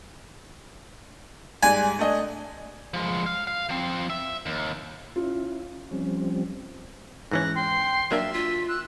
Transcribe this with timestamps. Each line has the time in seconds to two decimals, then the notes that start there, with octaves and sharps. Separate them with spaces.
1.63 G#2 G3 G#4 G#5
1.99 A3 D4 D#5
2.94 F3 G#3
3.26 F5
3.47 F5
3.69 F3 C4
4.10 E5
4.46 D#2
5.16 C#4 E4 F4
5.91 F3 G3 C4 C#4
7.31 G#2 E3 C#4 F#6 A#6
7.55 G5 C6
8.11 F#3 A#3 D4 E5 E6
8.33 F4 B6
8.68 E6 F#6